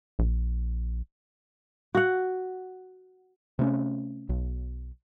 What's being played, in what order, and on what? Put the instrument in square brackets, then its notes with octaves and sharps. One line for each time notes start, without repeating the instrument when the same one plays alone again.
[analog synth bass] A#1
[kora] F#4 F#5
[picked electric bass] C3 A3 C4 C#4
B1